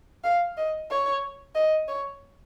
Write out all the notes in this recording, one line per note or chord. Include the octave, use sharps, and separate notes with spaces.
F5
D#5
C#5
D#5
C#5